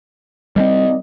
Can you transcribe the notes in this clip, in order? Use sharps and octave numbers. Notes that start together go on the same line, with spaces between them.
D#2 G3 G#3 C4 D5 D#5